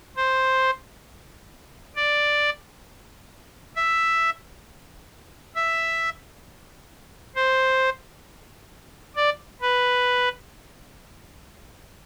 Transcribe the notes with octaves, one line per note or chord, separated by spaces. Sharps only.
C5
D5
E5
E5
C5
D5
B4